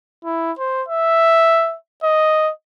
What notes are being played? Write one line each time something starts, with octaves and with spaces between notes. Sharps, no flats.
E4
C5
E5
D#5